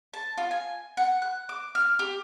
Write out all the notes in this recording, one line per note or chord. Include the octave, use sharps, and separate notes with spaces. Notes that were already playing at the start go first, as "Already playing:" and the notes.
A5
F4
G#5
F#5
F#6
D6
F6
G4